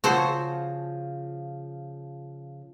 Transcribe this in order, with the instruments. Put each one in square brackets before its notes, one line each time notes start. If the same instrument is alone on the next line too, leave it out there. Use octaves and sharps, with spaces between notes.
[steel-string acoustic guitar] C#3 F3 [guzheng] F#4 A4 C5